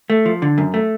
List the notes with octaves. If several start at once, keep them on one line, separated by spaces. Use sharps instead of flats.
A3
F3
D3
F#2
A3